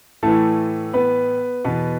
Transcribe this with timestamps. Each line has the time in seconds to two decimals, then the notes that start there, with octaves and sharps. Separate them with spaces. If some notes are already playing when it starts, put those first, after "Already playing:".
0.23 A2 E3 A3 A4
0.93 B3 B4
1.64 E2 B2 B3 B4